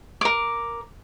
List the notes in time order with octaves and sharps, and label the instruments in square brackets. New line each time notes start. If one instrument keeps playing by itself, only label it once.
[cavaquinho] A#4 D6